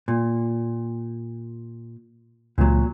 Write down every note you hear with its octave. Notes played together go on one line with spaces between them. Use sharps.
A#2
C#2 A#2 F#3